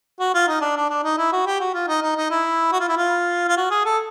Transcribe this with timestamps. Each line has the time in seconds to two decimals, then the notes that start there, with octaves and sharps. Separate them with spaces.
0.20 F#4
0.34 F4
0.48 D#4
0.62 D4
0.76 D4
0.90 D4
1.04 D#4
1.18 E4
1.32 F#4
1.47 G4
1.60 F#4
1.74 F4
1.88 D#4
2.02 D#4
2.16 D#4
2.31 E4
2.72 F#4
2.80 F4
2.89 E4
2.97 F4
3.48 F4
3.57 F#4
3.71 G#4
3.85 A4